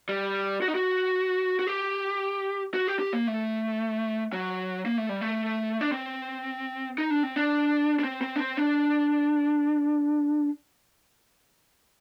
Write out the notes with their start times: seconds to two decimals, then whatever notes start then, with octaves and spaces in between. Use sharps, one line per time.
0.09 G3
0.62 F#4
0.68 D#4
0.75 F#4
1.59 F#4
1.67 G4
2.74 F#4
2.87 G4
3.00 G4
3.13 A#3
3.27 A3
4.33 F#3
4.86 A#3
4.98 A3
5.09 G3
5.21 A3
5.81 D4
5.92 C4
6.98 D#4
7.10 D4
7.23 C4
7.36 D4
7.99 D4
8.04 C4
8.21 C4
8.36 D4
8.40 C4
8.57 D4